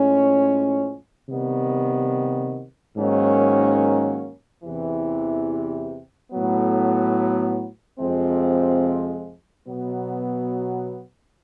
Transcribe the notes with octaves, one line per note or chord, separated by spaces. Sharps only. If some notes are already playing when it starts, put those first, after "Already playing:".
Already playing: A2 F3 G#3 C#4
C3 D#3 G3 B3
G#2 D#3 F#3 A#3 C#4
E2 C3 E3
A2 F#3 B3
F2 C3 F3 G#3 C4
B2 F#3 B3